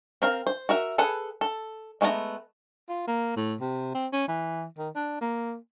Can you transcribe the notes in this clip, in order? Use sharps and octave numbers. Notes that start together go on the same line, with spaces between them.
C4 A#4 F5
C5
F#4 A#4 E5
G#4 A4 B4 F#5
A4
G#3 A3 B3 F#4 A#5
F4
A#3
A2
C3
C4
C#4
E3
D#3
D4
A#3